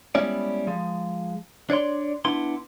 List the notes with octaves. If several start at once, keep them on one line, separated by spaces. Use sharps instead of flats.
G3 G#3 B3 C#4 E4 D5
F3 G#3
D4 C#5 D5 C6
B3 D4 E4 C6